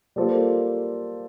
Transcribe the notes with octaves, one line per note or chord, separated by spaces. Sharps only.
G3 A#3 F4 A4 C5